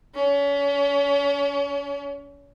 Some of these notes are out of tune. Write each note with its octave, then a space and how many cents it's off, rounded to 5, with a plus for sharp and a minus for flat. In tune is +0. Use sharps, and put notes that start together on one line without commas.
C#4 +35